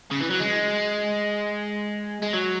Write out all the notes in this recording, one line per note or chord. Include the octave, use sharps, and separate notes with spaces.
C#3
E3
F#3
G#3
G#3
F#3